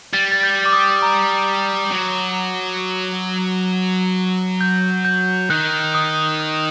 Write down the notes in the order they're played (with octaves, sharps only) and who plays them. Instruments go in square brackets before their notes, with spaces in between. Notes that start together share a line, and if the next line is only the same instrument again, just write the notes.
[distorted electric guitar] G3 [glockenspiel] A6
[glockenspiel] A6
G6
D6
D#6
A#5
[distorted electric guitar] F#3
[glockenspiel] G6
G6
[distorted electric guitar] D#3 [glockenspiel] F#6
[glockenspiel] D#6
D#6